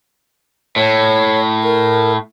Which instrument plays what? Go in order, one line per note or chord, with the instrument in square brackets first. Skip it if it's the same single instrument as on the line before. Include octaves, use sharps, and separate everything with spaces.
[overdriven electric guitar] A2 [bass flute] C#5
[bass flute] A#4